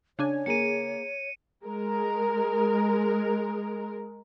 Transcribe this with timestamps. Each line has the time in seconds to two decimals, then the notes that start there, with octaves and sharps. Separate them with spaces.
0.19 C#3 D4 C#5 G#5
0.46 A#3 G#4 A#4 C#7 D#7
1.65 G#3 A#4